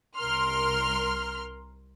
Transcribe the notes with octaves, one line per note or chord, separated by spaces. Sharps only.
C2 A#4 C6 F6